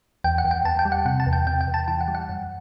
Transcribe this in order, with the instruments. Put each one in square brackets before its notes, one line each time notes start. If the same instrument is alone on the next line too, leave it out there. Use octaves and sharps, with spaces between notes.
[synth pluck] E2 G5
F#5
E2
G5
E2 A5
G5
G3
F#5
C3 F#5
A5
E2
G5
C3 G5
G5
E2
A5
E3 G5
F#5
G3
F#5
F#2